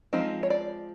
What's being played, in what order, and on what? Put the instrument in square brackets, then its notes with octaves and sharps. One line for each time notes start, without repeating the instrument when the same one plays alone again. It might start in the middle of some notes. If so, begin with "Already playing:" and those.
[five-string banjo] F3 G#3 C4 D#4
C#5
D5